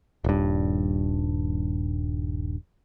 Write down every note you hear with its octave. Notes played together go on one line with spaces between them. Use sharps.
D#1 G2